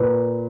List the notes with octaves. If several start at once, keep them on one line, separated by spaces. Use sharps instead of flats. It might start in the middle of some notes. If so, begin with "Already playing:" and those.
Already playing: A#2 B4